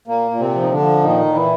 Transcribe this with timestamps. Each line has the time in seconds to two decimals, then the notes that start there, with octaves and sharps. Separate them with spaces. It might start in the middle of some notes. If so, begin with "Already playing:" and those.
0.07 A#2 A#3
0.31 A#2
0.39 C3 C4
0.55 F3
0.63 D#4
0.71 D3 D4
0.79 F3
1.03 A#2 D#3 D#4
1.26 A#2
1.34 E3 E4